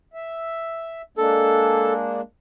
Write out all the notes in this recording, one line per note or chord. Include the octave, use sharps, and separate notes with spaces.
E5
G#3 A#3 D4 A4